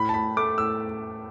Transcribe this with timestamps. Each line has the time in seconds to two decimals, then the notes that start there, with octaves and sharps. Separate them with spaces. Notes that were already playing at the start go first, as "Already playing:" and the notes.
Already playing: A2 B5
0.09 A5
0.14 A2 B5
0.37 A3 D6
0.58 A2 E6